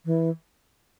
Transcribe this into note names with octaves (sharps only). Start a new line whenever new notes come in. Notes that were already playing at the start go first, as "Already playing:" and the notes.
E3